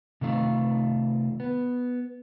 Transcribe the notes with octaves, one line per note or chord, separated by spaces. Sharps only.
C3 D#3 A3 F4
B3